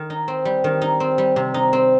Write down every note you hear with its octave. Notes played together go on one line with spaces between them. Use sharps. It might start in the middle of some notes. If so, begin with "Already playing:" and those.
Already playing: D#3
D#4
C4
G3
D#3
D#4
C4
G3
C3
D#4
C4